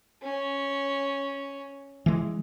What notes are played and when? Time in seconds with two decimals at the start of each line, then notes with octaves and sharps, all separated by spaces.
0.23 C#4
2.06 E3 G#3